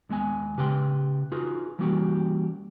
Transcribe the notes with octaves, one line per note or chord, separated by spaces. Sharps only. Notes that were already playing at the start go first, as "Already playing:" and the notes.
D#2 G#3 B3 G#5
C#3 G4 B4 G5 C6
D#4 F4 F#4 G#4 B4
E3 G3 A#3 C#4 F#4 G4